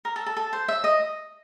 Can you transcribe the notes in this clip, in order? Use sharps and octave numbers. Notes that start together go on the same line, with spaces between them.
A#4
A4
A4
A4
C5
E5
D#5